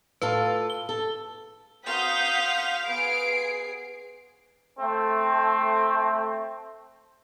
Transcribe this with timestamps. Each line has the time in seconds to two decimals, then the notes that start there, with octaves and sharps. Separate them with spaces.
0.22 A2 F4 A4 B4
0.70 G7
0.89 A4
1.87 C4 F#4 A#4 F5 F#5 D#6 G6 B6
2.87 B3 G#4 C7 D7
4.79 A3 C4